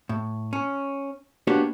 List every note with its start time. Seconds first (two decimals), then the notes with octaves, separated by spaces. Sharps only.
0.09 A2
0.53 C#4
1.47 A#3 B3 D4 F#4 G4 C#5